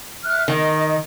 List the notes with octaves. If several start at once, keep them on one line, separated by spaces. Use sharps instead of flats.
E5 F6 F#6
D#3 D#5